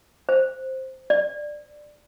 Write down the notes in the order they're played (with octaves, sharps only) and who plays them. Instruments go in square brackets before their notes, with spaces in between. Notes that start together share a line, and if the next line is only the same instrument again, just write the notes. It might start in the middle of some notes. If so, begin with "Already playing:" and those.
[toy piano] C5
D5